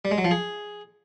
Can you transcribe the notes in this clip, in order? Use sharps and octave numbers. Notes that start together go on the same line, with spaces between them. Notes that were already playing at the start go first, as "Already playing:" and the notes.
G3
G#3
F#3
F3
G#4